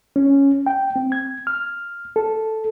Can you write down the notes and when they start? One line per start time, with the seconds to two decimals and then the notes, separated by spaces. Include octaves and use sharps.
0.16 C#4
0.66 G5
0.96 C4
1.12 G#6
1.47 F6
2.16 A4